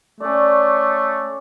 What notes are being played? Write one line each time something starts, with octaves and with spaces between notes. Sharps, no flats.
A3 C#4 D5